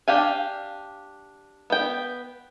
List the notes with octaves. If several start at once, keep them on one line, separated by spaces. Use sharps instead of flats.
D4 G4 F5 G#5
B3 G5